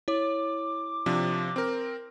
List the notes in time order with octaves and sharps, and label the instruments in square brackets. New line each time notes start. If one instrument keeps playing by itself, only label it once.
[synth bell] E4 C#5 [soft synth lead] D6
[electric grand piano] C3 F3 D4
C4 A#4